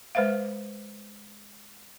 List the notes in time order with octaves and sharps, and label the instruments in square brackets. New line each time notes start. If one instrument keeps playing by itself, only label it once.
[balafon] G#3 B4 C5 E5 F5